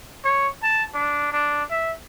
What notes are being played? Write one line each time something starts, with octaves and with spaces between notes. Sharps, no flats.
C#5
A5
D4
D4
E5